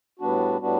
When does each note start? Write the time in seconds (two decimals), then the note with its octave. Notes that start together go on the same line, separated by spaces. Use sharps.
0.19 A2 G3 B3 D4 F#4
0.61 A2 G3 B3 D4 F#4